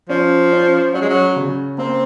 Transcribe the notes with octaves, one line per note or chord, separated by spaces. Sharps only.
F3 C#4
C#4
F#3 C#4
G#3
F#3
C#3
A#3 C4